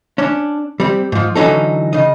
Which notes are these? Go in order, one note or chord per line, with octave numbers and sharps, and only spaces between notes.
C#4 D4
G3 C4
G#2 F3
D3 E3 F#3 C#4 D#4 A4
C#3 D#5